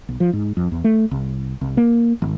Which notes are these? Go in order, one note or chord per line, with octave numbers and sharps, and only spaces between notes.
B1
F3
G#2
F2
E2
A3
C2
C2
A#3
G#1